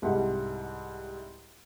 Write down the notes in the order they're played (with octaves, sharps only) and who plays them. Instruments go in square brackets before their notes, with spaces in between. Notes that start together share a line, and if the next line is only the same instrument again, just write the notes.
[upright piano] C2 G#2 G3 E4 F#5